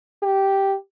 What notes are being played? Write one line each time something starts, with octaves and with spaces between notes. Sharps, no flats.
G4